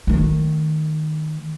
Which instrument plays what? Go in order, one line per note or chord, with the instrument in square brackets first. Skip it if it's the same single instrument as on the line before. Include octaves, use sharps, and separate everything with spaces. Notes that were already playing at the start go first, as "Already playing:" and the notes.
[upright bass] D#3 A3